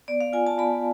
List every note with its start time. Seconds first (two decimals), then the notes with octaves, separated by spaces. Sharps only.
0.08 B3 D5
0.21 F5
0.33 F4 G#5
0.47 A5
0.58 B3 B5